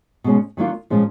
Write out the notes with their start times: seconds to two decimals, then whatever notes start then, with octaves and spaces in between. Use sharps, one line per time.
0.24 B2 G#3 C#4
0.57 D#3 F#3 A#3 D4 F4
0.90 A#2 F3 G#3 C#4